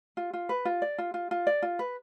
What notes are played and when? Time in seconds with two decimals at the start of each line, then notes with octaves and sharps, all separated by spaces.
0.17 F4
0.33 F4
0.49 B4
0.65 F4
0.82 D5
0.98 F4
1.14 F4
1.31 F4
1.47 D5
1.62 F4
1.79 B4